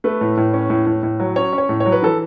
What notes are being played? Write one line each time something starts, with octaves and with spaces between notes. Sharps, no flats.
A3 B4
A2
A2
C#4
A2
A2
A2
F#3
C#4 C#5
C#4
C#5
A2
C#5
F#3
B4
E3 A4